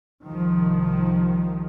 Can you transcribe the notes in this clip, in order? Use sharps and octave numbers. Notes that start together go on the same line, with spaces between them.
C2 D#3 F3